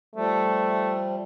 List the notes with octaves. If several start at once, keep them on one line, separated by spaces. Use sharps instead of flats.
F3 G3 A3